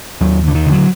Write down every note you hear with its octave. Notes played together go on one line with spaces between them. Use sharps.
D#2 F#3
D#2 D3
D#3
D3
F#3